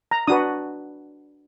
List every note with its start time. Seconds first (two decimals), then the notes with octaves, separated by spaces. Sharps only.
0.11 A#5
0.27 D4 F#4 B4 D#6